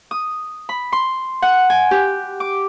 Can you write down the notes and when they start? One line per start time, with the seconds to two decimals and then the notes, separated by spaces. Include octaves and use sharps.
0.11 D#6
0.69 B5
0.92 C6
1.42 F#5
1.70 G#5
1.91 G4
2.40 D6